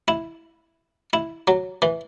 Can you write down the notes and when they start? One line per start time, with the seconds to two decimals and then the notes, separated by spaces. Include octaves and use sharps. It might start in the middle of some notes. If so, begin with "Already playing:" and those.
0.08 E4
1.13 E4
1.47 F#3
1.82 E3